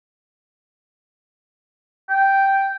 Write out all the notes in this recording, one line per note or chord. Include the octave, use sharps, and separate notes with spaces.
G5